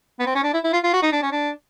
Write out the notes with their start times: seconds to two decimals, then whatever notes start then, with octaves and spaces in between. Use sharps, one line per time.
0.20 B3
0.26 C4
0.35 C#4
0.44 D4
0.54 E4
0.64 E4
0.73 F4
0.84 F4
0.93 F#4
1.02 D#4
1.13 D4
1.23 C#4
1.32 D4